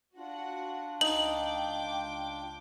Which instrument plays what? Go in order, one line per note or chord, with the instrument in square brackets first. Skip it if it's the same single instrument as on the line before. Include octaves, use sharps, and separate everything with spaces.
[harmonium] D4 F4 [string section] F#4 F#5
[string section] C#2 G5 D6 [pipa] D#4 [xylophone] F#7